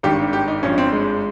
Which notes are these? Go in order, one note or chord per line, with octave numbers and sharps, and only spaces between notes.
G#1 G2 D#3 G4
G4
D#4
G#1 G2 F3 C#4
C4
G#3